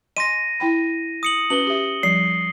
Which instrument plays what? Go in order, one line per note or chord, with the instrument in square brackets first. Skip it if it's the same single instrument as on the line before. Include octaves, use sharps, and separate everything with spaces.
[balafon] D#5 G#5 C6 [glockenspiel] A#6 D#7
[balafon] E4 G5 B5
[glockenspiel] D#6 C#7 F#7
[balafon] C#4 F#4 B4 [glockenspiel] F#7 G7
[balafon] G4 E5
[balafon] F3 G3 [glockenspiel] C7